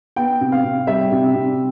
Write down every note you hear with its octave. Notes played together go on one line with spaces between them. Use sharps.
B3 G5
C3
F5
C3
G3 E5
C3
C3